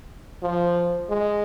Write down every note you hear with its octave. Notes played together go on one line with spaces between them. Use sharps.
F3
G#3